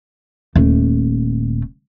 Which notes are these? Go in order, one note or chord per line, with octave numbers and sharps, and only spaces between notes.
D#1 A3